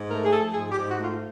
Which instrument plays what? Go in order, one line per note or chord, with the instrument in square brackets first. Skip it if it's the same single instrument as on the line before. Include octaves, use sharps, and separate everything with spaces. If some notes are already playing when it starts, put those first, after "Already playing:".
Already playing: [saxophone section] G#2
A3 A#4
G#4
F3 A4
G#2 G#4
G4
G#2
F#4
A3 F4